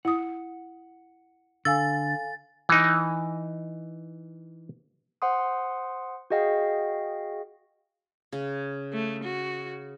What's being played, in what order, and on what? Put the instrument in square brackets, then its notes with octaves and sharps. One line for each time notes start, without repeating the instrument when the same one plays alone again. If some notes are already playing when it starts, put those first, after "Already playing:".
[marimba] E4 D#6 [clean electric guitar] F#5
[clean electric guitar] D3 [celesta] A4 F5 G#5 [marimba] E6 [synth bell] A6
[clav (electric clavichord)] E3 D#4
[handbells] C5 F#5 C6 D#6
F#4 G#4 D#5 F5 G5
[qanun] C#3
[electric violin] A3
F#4